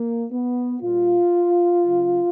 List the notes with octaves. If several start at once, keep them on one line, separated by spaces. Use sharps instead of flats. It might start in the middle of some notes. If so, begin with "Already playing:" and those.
Already playing: A#3
B3
A#2 G3 F4
C#3 F#3